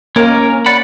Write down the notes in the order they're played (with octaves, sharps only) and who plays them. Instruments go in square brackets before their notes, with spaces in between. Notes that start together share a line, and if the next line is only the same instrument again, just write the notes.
[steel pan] A#3 [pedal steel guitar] C#4 A#4
[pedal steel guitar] D5 F#5 B5